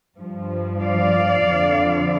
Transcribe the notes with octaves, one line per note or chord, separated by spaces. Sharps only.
G2 F3
D5 F5
F2 D3 F3